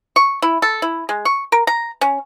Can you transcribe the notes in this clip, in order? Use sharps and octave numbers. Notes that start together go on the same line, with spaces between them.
C#6
E4
A4
E4
G#3
C#6
A#4
A#5
C#4